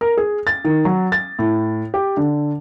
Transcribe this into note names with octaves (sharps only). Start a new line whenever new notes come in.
A#4
G#4
A6
D#3
F#3
A6
A2
G4
D3